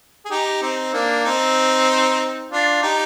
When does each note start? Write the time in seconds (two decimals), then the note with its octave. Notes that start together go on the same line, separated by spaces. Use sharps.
0.26 G#4
0.31 D#4 G4
0.62 C4 D#4
0.93 A#3 D4
1.25 C4 D#4
2.52 D4 F4
2.83 D#4 G4